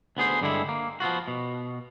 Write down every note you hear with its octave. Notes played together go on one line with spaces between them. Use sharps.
D2 B3 G#4 C5
G2 D3 G#3 E4
A#3
F3 B3 F4 F#4
B2